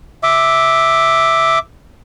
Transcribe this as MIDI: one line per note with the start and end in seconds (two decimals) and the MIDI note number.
0.23 1.59 76
0.23 1.59 86